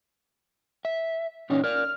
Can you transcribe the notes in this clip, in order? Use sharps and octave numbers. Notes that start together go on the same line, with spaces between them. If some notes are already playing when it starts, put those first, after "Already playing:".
E5
A#2 E3 C#4 D#4
A#4 D5 F6